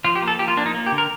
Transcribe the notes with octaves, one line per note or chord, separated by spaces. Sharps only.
F3 F4
G4
A#3
A4
F3 G4
F4
A#3 D4
D#4
A#3
G4
D3
A#4